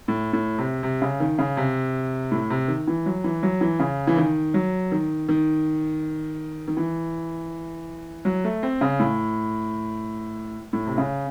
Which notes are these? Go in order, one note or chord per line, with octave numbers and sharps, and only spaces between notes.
A2
A2
C3
C3
C#3
D#3
C#3
C3
A2
C3
D#3
E3
F#3
E3
F#3
E3
C#3
E3
D#3
F#3
D#3
D#3
D#3
E3
F#3
A3
C4
C#3
A2
A2
C3
C#3